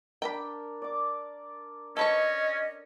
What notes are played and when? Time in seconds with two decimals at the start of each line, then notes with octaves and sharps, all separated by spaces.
0.22 D4 A#4 G5 A#5 B5
0.82 D5 D6
1.97 C#4 A4 B4 C#5 D#5